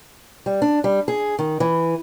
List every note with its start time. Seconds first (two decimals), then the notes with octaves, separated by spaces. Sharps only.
0.46 G3
0.62 D4
0.84 G3
1.08 G#4
1.39 D#3
1.60 E3